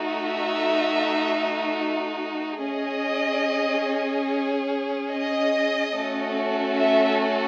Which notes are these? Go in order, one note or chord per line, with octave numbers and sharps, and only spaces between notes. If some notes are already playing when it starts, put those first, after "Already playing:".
Already playing: A3 D#4 F#4
E5
C#4 G#4 D#5
D#5
A3 C#4 F#4 A4
E5